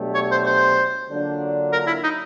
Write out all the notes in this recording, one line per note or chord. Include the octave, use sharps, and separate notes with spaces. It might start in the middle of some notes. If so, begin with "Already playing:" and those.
Already playing: B2 F#3 A3 D4 G4
C#5
C5
C5
D3 F#3 A#3 D4 F4
A#4
E4
D#4